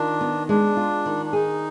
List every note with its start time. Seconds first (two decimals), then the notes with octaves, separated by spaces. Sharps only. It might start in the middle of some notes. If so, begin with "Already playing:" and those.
Already playing: D#3 D4 F4
0.21 B3
0.49 G#3 D4
0.77 F4
1.06 D#3
1.26 D4
1.33 D#4 G#4